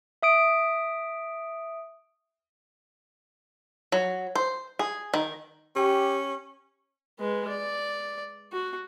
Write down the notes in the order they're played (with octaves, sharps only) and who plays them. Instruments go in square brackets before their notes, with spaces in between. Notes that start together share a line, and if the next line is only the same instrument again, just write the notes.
[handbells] E5 D#6 D7
[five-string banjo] F#3
C5
G#4
D#3
[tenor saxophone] C#4 [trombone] G4
[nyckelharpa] G#3 B4
D5
F#4